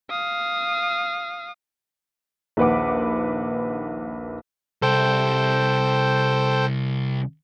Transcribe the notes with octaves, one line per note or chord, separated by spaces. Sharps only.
F5 D#6
A#1 D#2 B4 F#5 D6
C2 A4 C5 G5